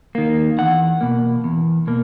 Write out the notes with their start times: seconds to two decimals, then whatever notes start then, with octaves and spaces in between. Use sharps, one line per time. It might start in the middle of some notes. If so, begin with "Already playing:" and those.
0.15 D#3 A#3
0.58 E2 F#5
1.01 B2 A#3
1.44 E2
1.87 B2 A#3